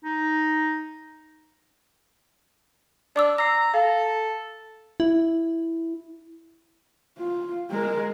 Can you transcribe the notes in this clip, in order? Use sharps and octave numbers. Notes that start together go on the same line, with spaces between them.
D#4
D4 D5 D6 E6
A#5 E6 C7
A4 F5
E4
F4
G#3 A#4